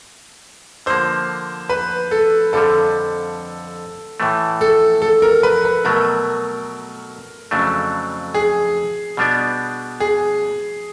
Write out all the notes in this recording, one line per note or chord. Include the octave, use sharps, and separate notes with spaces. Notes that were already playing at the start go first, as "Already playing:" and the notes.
D3 F3 A#3 C5
B4
A4
F2 D3 G3 A4
A2 E3 A3
A4
A4
A#4
B4
B4
B2 F#3 A3 A#4
F2 C#3 F#3 A3 D4
G#4
B2 G3 B3 D4
G#4